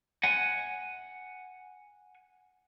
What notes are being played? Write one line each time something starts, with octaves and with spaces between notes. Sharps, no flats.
F#5 G#5